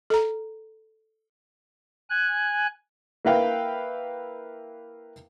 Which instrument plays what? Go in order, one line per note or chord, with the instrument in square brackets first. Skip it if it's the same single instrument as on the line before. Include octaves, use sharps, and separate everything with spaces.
[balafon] A4 A#5
[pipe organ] G#5 F#6
[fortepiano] A#3 E4 B4 F5 G5